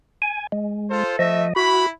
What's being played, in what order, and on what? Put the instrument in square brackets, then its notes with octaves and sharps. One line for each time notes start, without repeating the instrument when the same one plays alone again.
[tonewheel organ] G#5
G#3
[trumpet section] F4 A4 C5
[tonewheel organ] F3 D#5 [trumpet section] A3 E5
[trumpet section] E4 B5 [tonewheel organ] F#4